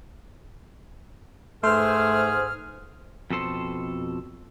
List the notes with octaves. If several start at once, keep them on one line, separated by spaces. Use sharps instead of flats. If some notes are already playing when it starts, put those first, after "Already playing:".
G#2 A3 G#4 B4 C5 F6
F2 B2 A4 C5